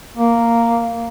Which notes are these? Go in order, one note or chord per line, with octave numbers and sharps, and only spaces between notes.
A#3